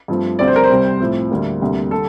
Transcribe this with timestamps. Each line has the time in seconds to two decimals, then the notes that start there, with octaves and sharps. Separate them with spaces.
0.08 G2 F3 A3 C4
0.39 D2 C3 G3 C4 D5
0.48 C5
0.56 A#4
0.64 C5
0.70 C2 C3 G3
1.00 A2 F3 C4
1.31 D2 D3 G3 A#3
1.61 D2 C3 G3 A#3
1.91 D3 G3 A4